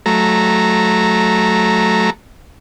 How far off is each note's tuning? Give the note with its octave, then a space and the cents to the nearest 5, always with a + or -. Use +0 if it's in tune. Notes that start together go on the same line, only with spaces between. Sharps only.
F#3 -10 A3 -15 A#5 -10